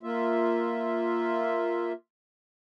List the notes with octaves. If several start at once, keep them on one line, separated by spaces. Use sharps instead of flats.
A#3 F4 E5